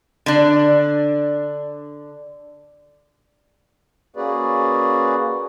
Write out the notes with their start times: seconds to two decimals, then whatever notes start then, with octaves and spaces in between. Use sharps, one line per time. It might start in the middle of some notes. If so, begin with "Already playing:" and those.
0.26 D3 D4
4.16 A#3 C#4 F#4 G#4 B4 D5